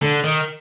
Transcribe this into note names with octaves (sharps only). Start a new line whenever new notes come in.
D3
D#3